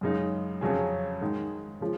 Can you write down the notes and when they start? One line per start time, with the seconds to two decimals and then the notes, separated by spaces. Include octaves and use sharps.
0.01 F#2 C#3 G#3 D#4
0.61 F2 C#3 F#3 C#4 G#4
1.21 G#2 D#3 G#3 D#4
1.81 C#3 F3 G#3